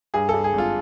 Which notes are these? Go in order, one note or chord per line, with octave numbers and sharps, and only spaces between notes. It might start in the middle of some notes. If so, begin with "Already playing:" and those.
G2 G#4
G2 A4
G#4
G#1 F4